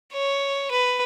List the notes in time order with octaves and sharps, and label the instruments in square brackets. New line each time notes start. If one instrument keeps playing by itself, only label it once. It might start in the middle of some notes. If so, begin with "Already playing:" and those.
[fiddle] C#5
B4